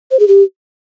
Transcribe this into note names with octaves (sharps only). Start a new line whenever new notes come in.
C5
G#4
G4